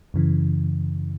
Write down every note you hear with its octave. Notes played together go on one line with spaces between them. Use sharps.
F#2 C#3 E3